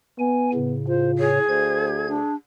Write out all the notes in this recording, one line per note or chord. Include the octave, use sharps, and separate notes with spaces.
B3 G#5
A2 C#3
F4 C5
G#4 C#5
D2 C5 G#6
D4